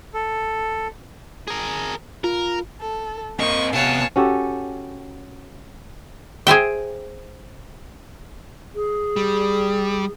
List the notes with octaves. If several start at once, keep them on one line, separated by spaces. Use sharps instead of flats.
A4
G#4 A#4
F4 A#4
A4
A#3 C4 D#5 C#6
C3 B3 C#5 F5 G#5 A5
C#4 F#4 G4 A4
G#4 C5 E5 G5
G#4
G3